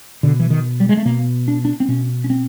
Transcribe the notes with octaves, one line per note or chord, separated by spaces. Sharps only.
B2 D3
E3
D#3
G3
G#3
A3
B2 A#3
D4
D4
C4
B2 C#4
C#4
C4